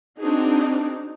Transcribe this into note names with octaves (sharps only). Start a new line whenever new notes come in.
C4 D4 D#4 F#4 G#4